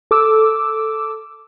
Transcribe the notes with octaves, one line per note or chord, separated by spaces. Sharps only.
A4 D6 E6